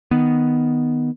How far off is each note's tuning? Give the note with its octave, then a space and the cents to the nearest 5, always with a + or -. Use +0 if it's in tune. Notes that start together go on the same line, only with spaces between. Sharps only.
D#3 +0 B3 +0